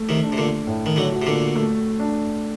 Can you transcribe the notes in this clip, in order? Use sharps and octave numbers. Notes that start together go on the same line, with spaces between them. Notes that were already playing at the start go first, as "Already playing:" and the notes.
Already playing: A3
C3 D#3
D4
C3
A#2 D3
A2
D#3
D3 F#3
F#4
C3
A#2 D3
A3
D4